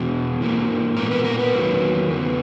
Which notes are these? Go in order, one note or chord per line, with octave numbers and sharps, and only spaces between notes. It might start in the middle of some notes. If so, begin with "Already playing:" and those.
Already playing: E2 B2 G#3
G#2 E3 A#3
A#2 G#3 B3 A#4
B4
A#4
B4
E2 D#3 F#3 A#3
E2 C#3 B3